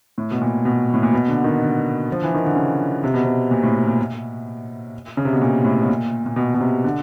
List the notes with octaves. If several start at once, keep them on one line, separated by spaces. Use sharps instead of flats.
A2
B2
A#2
B2
A2
A#2
B2
D3
D#3
D3
F3
E3
D#3
D3
C#3
C3
B2
C3
A#2
A2
A#2
C#3
C3
B2
A#2
A2
B2
A#2
A#2
B2
B2
C3
D3